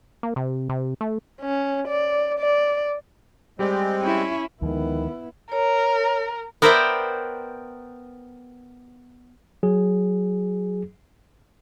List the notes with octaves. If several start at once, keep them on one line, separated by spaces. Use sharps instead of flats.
A#3
C3
C3
A3
C#4
D5
D5
G3 G#3 C4 G4 D5
C#4 E4
D2 D#3 F3 G#3 B3 E4
A#4 C#5
B3 A#4 C5 D5 E5 G5
F#3 G#4